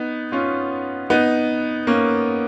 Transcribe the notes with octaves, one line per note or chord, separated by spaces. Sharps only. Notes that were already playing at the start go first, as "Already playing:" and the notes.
Already playing: B3 D#4
C#4 F4
B3 D#4
A#3 C#4